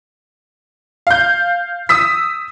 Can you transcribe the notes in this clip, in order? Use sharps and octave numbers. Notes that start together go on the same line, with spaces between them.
F5 G6
D#6 E6 B6